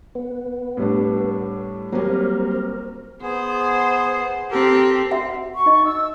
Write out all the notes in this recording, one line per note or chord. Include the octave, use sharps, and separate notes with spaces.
B3
A2 G3 D4
F#3 G3 A#3 C4 A#4
B3 G#4 C5
C4 G4 A4 A#4
F#4 E5 F#5
C#6
D#4 D#5
E6